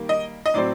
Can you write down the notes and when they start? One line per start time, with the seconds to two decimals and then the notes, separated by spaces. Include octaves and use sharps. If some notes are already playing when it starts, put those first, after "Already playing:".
Already playing: D#3 G3 A#3
0.09 D#5
0.46 D#5
0.54 A2 F#3 C4 D5